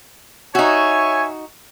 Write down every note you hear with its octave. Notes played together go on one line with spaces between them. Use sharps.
D#4 F#4 C#5 E5 G#5